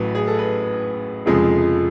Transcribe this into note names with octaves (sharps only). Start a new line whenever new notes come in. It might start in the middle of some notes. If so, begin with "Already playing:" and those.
Already playing: A1 A2 F#3 B4
G#4
A4
B4
F1 F2 C#3 F3 G#3